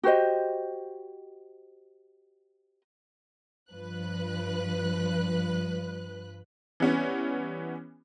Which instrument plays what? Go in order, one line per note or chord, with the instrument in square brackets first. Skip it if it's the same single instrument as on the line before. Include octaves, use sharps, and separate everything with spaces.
[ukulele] F#4 G4 C5 D#5
[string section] G2 F3 B4 F#6
[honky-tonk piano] E3 G3 B3 C#4